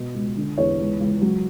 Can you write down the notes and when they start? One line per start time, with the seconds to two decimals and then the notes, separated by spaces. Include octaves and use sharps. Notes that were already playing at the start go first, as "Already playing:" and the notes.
Already playing: B2
0.14 C#2
0.37 D3
0.58 E2 C#5
0.79 C#2
1.00 C#2
1.22 F#3